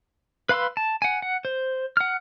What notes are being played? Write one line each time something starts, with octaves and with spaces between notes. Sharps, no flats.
B4 F5 B5 C6 E6
A5
F#5 G#5
F#5
C5
F#5 F6